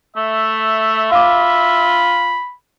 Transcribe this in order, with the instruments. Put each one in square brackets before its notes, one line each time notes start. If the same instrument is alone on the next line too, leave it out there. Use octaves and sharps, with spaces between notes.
[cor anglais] A3 [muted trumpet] E5
[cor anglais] F4 [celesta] F5 D6 [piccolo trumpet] B5